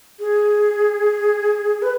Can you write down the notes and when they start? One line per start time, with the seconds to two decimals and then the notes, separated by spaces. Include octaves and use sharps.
0.20 G#4
1.82 B4